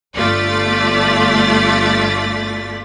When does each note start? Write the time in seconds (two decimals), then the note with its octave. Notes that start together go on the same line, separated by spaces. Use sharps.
0.16 G1 A3 F4 D5 A6 B6